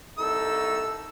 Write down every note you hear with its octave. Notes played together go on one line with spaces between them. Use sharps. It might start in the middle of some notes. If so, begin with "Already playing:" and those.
C2 D#4 A4 E6